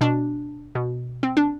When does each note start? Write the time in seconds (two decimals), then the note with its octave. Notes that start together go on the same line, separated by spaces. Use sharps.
0.01 B2 D4
0.75 B2
1.23 C4
1.37 D4